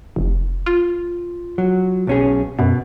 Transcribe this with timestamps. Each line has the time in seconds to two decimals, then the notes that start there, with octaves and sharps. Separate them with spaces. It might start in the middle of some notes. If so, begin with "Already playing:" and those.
0.16 F1
0.66 F4
1.58 F#3
2.07 B1 C#4 G#4
2.59 F#2 B2